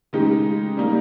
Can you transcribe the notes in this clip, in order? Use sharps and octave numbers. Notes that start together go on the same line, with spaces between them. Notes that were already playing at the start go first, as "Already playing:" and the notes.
C#3 G#3 D#4 G4
G3 A#3 D#4